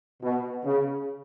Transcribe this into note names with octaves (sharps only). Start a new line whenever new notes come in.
B2
C#3